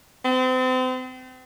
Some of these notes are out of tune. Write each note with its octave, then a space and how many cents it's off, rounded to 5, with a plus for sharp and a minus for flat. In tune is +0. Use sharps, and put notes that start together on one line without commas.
C4 -35